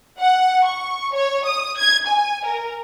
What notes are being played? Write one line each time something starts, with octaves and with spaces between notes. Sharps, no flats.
F#5
C#6
C#5
D#6
G#6
G#5
A#4